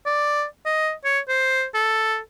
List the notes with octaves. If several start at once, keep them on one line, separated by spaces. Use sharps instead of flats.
D5
D#5
C#5
C5
A4